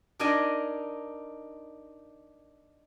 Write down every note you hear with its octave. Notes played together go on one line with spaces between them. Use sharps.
D4 D#4 A#4 D5 D#5 G#5